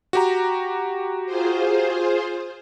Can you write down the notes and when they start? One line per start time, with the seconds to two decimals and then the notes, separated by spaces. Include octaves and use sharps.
0.13 F#4 G4 A#5
1.26 F4 G#4 C5